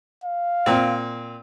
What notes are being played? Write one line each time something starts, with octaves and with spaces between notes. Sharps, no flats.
F5
A#2 C4